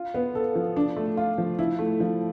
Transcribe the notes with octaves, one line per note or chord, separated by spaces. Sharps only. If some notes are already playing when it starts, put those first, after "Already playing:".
Already playing: F4
B3
A4
F3
D4
A3
F4
F3
E4
A3
F3